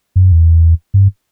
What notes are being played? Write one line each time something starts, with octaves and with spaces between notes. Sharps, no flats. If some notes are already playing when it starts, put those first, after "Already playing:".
F#2
E2
G2